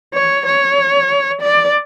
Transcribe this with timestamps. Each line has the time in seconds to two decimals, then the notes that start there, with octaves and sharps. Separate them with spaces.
0.14 C#5
0.46 C#5
1.41 D5